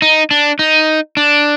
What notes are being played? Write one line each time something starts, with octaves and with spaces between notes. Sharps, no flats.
D#4
D4
D#4
D4